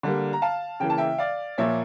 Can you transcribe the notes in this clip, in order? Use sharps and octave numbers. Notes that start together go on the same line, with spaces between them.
D3 G3 A#3
A#5
F5 A5
C#3 E3 A#3 G5
A5
E5 G5
D5 F5
A#2 F3 A#3 C#5 E5